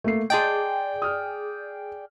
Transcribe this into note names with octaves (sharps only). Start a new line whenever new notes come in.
A3 A#3 C7
G#4 D5 D#5 G5 A5 C6
D#6 F6